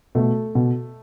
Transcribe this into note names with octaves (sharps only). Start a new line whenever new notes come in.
B2 A3 A4
B2